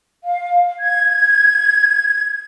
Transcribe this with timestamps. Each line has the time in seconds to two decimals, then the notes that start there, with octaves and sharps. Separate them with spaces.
0.23 F5
0.81 G#6